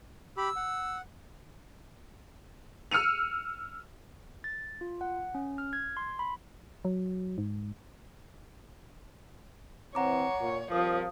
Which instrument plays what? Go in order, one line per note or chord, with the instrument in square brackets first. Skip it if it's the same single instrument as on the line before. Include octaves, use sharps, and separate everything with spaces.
[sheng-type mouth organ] G4 B5 [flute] E6
[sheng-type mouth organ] F#5
[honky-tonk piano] E6 F6 C#7 D#7 F7
[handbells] A6
F4
F#5
C#4
F6
G#6
C6
B5
[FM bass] F#3
G#2
[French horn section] E3 C4 [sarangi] C#5 [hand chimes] F#5 A#5 D6
[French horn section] A#2
[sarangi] F3 [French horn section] G3 C4 A#4 [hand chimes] D#6